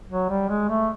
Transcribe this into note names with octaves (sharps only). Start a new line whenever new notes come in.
F#3
G3
G#3
A3